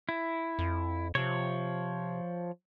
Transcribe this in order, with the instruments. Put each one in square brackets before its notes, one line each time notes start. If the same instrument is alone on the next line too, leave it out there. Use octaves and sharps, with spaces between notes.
[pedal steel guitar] E4
[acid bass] F2
[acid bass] C3 [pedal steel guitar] F3 C#5